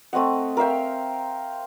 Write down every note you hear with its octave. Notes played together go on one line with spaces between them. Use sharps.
A3 C4 D#5 F#5
A#4 E5 F5 G5